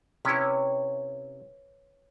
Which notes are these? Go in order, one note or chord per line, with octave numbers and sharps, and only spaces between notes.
C3 C#4 E4 B4 C#5